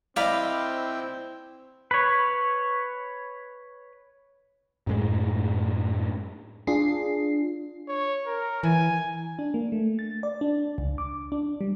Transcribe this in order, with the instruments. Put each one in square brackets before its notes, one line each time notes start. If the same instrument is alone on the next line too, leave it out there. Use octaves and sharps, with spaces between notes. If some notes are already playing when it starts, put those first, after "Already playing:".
[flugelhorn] C4 [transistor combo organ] E4 G5 [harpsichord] D5 D#5 [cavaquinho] F5 B5
[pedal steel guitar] B4 C#5
[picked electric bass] F#2 A2 G#3
[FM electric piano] D4 F4 G#4 C7
[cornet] C#5
A#4
[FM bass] E3 [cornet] G#5
[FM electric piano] D4
A#3
A3
A6
D5
D4
C#2
D6
D4
G3